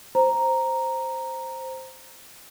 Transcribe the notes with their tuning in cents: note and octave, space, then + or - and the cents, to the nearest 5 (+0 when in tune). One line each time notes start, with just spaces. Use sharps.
C5 +0 A#5 +0